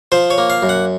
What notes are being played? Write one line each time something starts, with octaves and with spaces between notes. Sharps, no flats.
F3 C5
C#5
A#3
F5
F#2
F#5